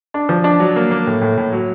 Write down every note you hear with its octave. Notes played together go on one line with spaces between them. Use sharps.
D4
F3
D4
F#3
A#3
A#3
A2
A2
A2
F#3